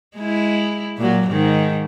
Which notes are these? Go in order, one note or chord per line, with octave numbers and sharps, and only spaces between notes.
G#3 E4
A#2 F#3
G#2 D#3